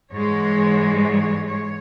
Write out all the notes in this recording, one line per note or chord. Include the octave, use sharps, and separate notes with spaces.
G#2 E3 G#3 C#5
C#5
C#5